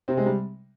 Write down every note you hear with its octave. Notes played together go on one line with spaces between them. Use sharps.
C3 C4
G#3
G3